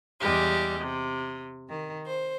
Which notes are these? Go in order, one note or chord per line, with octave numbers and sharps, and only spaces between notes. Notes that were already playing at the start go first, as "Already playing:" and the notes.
E2 G3 G#3 G4
C3
D#3
C5